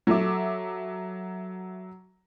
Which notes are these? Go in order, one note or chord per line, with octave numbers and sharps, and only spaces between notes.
F#3 A4 E5 D6